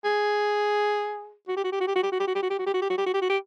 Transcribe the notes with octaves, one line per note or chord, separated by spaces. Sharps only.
G#4
F#4
G4
F#4
G4
F#4
G4
F#4
G4
F#4
G4
F#4
G4
F#4
G4
F#4
G4
F#4
G4
F#4
G4
F#4
G4
F#4
G4